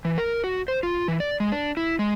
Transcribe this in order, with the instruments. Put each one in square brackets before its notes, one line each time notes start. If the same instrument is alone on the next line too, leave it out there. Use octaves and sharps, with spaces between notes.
[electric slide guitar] E3
A#4
F#4
C5
F4
E3
D5
G#3
D4
E4
G#3